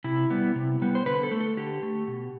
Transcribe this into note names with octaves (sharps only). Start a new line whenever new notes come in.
C3 E4
G3 B3
C3
G3 B3
C5
D3 B4
A4
A3
A4
D3 G4
A3
B2